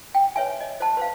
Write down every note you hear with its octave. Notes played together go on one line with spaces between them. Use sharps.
G5
B4 C#5 E5 G#5
D#5
C5 A5
B4 C5 F5